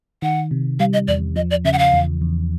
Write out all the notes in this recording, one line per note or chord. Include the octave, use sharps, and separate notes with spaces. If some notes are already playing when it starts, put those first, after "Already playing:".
D#3 F#5
C3
G3 F5
D#5
E2 D5
F3 D#5
D5
C#3 E5
F#5
F5
E2
E2